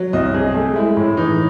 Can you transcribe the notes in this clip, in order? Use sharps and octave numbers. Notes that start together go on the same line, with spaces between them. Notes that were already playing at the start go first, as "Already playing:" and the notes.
Already playing: F#3
C2 D#5
C3 G#4
A3 G#4
G#3 E4
A2
E3 D#4